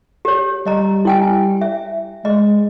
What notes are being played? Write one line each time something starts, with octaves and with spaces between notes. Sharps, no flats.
G4 C#5
G3 D#5 A#5
E4 G5 G#5
E5
G#3 D#5